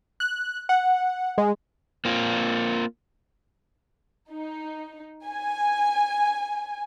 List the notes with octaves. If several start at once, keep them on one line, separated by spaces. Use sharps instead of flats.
F#6
F#5
G#3
A#3 C4 F4
D#4
G#5